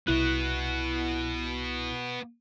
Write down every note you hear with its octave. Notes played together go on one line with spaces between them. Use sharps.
C2 B3 E4 F#4 F#6